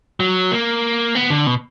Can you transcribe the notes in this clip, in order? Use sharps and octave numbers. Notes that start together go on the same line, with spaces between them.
F#3
A#3
B3
D3
B2